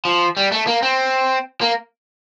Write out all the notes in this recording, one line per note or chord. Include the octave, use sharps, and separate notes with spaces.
F3
G3
A3
A#3
C4
A#3